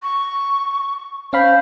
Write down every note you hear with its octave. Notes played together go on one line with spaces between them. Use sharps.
C#6
C#4 C5 F5 B5